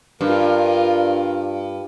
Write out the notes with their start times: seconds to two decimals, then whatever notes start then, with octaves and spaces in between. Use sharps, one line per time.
0.21 G2 F4 A#4